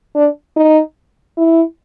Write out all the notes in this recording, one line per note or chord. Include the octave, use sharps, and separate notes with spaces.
D4
D#4
E4